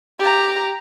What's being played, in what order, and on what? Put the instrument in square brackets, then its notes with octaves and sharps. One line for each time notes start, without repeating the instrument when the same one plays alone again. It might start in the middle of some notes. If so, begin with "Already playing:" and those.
[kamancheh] G4 A#5